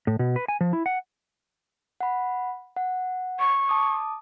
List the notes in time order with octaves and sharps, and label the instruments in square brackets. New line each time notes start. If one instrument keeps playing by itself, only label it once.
[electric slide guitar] A2
B2
B4
G#5
F3
E4
F#5
[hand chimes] F#5 B5
F#5
[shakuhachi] C#6
[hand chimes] A5 D6 D#6